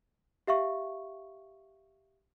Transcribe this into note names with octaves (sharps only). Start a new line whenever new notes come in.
G4 E5 F5 C#6